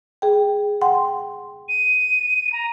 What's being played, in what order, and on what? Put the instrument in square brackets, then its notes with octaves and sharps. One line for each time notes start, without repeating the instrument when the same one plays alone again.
[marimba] G#4 G5
F#5 G5 C6
[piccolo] D#7
A#5